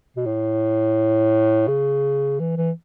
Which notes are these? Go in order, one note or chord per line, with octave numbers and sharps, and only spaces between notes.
B2
A2
C#3
E3
E3